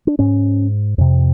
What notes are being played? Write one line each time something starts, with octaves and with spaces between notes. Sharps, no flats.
D4
G#2 C#4
F2 C3